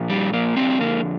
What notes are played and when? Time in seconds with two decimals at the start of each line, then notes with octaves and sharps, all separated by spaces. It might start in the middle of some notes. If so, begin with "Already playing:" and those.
Already playing: A#2 F3
0.10 G3
0.33 A#3
0.56 F2 D3 F3 G3 C4
0.81 A#3